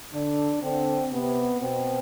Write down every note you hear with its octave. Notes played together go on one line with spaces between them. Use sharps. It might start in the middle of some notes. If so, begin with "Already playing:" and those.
D3 D4
D3 C4
C3 B3
B2 C4